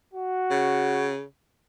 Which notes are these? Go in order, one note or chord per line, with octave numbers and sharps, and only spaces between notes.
F#4
C#3